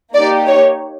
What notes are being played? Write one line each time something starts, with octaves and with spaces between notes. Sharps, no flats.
A#3 D#4 G4 D5
C#5